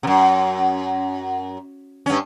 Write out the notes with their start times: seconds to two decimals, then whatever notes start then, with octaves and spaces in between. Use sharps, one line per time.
0.03 F#2 C3
2.06 G2 C#4